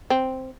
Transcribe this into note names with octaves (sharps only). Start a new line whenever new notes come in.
C4